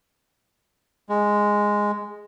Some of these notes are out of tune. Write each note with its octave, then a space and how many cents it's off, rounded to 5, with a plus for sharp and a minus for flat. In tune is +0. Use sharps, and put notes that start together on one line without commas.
G#3 -5